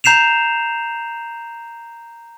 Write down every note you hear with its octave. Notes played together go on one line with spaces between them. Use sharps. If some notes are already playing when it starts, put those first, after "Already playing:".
A#5 G6 C7 E7 F7